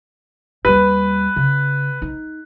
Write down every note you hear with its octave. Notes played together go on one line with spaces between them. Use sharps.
D#2 G3 B4
C#3
D#4